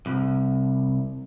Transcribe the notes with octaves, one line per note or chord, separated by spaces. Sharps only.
C2